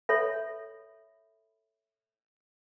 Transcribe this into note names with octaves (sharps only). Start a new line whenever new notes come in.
A4 C#5 E5 B5